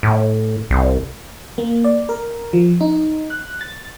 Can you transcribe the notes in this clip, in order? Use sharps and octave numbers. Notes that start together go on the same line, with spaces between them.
A2
C2
A#3
D5
A#4
F3
D#4
F#6
A6